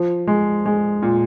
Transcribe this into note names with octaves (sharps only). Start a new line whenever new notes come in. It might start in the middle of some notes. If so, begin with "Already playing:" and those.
Already playing: F3
G#3
G#3
A#2